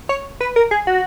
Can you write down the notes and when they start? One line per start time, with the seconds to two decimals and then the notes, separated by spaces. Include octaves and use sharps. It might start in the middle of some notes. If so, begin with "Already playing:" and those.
0.09 C#5
0.41 B4
0.56 A#4
0.71 G#4
0.87 F#4